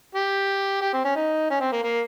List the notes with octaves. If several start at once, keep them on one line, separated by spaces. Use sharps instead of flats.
G4
G4
C4
C#4
D#4
C#4
C4
A#3
A#3